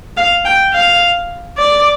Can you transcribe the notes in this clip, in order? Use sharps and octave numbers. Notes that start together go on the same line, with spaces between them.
F5
G5
F5
D5